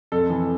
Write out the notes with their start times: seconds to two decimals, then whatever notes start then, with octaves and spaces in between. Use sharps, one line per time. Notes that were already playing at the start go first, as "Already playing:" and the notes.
0.12 F2 A4
0.30 E3